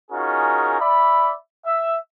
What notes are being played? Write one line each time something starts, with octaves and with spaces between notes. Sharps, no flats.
C#4 D#4 F4 F#4 G#4 A#4
D5 E5 B5
E5